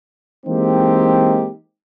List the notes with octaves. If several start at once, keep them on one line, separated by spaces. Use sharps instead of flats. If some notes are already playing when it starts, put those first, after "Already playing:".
E3 G#3 A#3 C4 D#4 G4